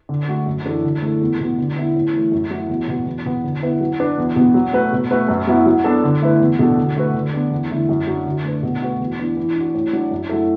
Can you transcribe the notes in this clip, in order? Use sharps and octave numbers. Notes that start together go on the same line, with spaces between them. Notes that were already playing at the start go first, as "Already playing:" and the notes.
D3
A3 F#4
F#2
E3 D4 F#4 A4
D3
A3 E4 A4
E2
B2 B3
D3
B3 E4
A2
E3 A3
F#2
F#3 A3 E4
E2
B2 B3 F#4
E2
B2 B3
D3
B3 E4 B4
F#3
D4 B4
E2
B2 B3
F#3
A3 F#4 B4
B2
A3 F#4 B4
F#2
F#3 B3 E4
F#3
B3 D4 A4
D3
A3 E4 B4
E2
B2 F#3 D4 A4
D3
A3 F#4 B4
D3
B3 D4
E2
D3 A3 E4
F#2
F#3 D4 F#4
D3
A3 D4 B4
B2
A3 F#4 B4
E2
E3 B3 D4
E3
D4 F#4
A2
F#3 D4
F#2
F#3 A3 E4 A4